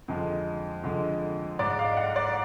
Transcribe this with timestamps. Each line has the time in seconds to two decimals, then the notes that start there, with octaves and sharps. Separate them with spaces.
0.08 F2 D3 G#3
0.83 F2 D3 G#3
1.59 G#2 G#3 D5
1.79 F5
1.97 F#5
2.16 D5